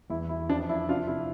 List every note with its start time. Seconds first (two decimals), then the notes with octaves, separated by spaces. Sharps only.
0.10 E2 E4
0.29 E3 E4
0.49 F2 D4
0.69 F3 E4
0.89 C3 D4 F4
1.07 C3 E4